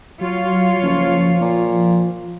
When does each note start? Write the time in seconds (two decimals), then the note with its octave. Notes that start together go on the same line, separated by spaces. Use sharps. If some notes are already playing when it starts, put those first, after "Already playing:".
0.21 F#3 F4 C#5 F5
0.83 F#1 F3
1.41 A#2